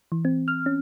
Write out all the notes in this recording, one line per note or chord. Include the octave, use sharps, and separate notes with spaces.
E3
C4
F6
C#4